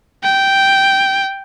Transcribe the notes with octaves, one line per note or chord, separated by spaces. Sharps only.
G5